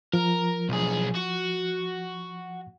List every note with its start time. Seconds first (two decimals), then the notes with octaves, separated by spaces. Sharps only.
0.13 F3 A#4
0.69 B1 G#4
1.15 F#4